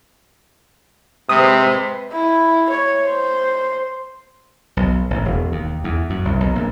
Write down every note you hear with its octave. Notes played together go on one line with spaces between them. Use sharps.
C3 G#3 B4 C5 D#6
E4
C#5
C5
B1
A1
E1
D#2
E2
F#2
C2
B1
A#1